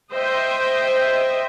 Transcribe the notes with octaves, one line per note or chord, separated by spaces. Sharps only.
C5 D#5 E5 G5